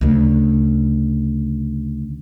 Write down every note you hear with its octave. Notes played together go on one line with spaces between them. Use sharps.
D2 C#3